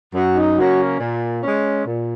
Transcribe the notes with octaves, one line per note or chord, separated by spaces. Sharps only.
F#2 F#4
D#4
C#3 F#3 A#3 C#4 F#4
A#2
G#3 C#4
A#2